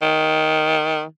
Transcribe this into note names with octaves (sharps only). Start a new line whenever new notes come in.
D#3